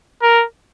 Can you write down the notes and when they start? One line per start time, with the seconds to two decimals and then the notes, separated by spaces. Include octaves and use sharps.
0.22 A#4